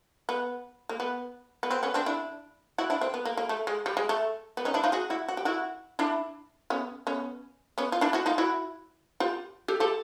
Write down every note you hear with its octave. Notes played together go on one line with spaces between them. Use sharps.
B3
A#3
B3
B3
C4
B3 C#4
C4 D4
D4 E4
E4 F#4
D4 E4
C4
B3
A#3
A#3
A3
G#3
G3
G#3
A3
B3
C#4 D#4
D4 E4
D#4 F4
F#4 G#4
E4 F#4
F#4
G4
E4 F#4
D4 E4
B3 C#4
B3 C#4
B3 C#4
F4
D4 E4
E4 F#4
D#4 F4
E4 F#4
F4 G4
G4 A4
G4 A4